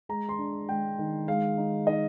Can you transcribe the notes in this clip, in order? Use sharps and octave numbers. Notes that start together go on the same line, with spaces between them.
G#3 A#5
C6
D4
G#3 G5
D#3
G#3 F5
D#4
D#4 D#5